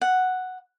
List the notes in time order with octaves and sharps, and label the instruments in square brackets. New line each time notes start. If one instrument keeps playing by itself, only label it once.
[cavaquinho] F#5